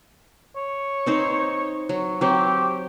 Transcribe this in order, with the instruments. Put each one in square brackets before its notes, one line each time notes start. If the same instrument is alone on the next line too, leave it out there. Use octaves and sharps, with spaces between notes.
[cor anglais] C#5
[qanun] C4 D#4 C5
F#3
[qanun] F#3 C4 [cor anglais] G4